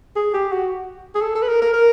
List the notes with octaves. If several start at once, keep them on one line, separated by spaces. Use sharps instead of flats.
G#4
G4
F#4
G#4
A4
A4
B4
A#4
A#4
A#4